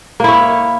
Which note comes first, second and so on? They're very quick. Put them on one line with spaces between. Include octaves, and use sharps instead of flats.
A#3 E4 C#5